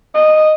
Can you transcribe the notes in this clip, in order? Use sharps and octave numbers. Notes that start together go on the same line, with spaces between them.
D#5